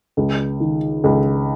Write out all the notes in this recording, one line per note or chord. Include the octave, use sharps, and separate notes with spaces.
C#2
D#3
C#2